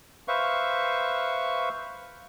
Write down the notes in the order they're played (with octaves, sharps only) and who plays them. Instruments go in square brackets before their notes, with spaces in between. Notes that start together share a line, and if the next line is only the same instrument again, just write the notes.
[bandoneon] B4 C5 E5 F5 C#6